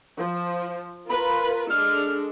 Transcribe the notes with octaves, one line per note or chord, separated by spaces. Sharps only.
F3
F4 A#4 B4 B5
G#3 D4 A4 F6